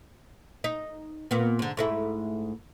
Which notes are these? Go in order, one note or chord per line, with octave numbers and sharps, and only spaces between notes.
D#4
A#2 B3
G#2 D3
G#2 A3 E4